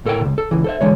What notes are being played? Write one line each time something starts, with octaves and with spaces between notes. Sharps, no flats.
A2 A4 A#4 E5 G5
C#2 C3
A4
C#2 E3
A4 C5 E5
D3 E3 G#3 C#5